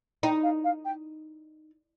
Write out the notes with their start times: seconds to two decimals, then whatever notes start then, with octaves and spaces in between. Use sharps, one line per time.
0.23 D#4 G5
0.43 F5
0.64 F5
0.85 G5